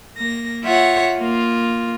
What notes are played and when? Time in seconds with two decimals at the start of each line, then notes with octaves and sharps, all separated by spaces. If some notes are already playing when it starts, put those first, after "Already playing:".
0.16 A#3 A#6
0.63 F4 C#5 E5 F#5
1.17 A#3 F4